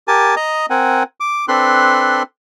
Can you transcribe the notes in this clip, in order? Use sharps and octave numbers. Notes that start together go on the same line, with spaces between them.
G4 A#4 G#5 A5
D#5 A#5 D#6
C4 A#4 F#5 G#5
D6
C4 D4 A4 B4 C6 F#6